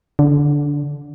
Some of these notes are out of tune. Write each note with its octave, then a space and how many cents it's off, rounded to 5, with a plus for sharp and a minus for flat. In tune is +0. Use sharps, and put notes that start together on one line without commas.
D3 -15